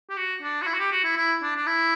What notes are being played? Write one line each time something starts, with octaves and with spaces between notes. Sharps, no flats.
G4
F#4
D4
F#4
E4
F#4
G4
F#4
E4
E4
D4
D4
E4